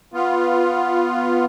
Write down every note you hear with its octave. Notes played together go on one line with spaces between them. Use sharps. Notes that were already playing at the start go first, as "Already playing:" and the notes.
B3 F4